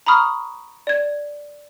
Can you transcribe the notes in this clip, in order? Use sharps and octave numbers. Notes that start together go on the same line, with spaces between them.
A#5 B5 C#6 D#6 F6
D5 G#6